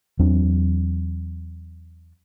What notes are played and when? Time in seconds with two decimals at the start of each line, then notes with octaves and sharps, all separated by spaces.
0.19 E2 F#3 C4 D4